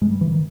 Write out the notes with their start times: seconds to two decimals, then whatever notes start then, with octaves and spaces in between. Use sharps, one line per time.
0.01 G2 G#3
0.11 G3
0.21 E3
0.32 D#3